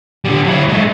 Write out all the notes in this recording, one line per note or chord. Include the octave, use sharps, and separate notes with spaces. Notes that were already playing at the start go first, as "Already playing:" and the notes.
D3 G3
F#3 E4
G#3 A3